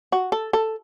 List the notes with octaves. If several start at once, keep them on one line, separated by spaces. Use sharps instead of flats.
F#4
A4
A4